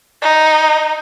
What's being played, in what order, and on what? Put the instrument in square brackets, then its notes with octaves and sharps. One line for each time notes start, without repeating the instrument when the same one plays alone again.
[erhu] D#4